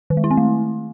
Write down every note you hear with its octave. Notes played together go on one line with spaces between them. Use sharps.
D#3
G#3
E4
C4
A3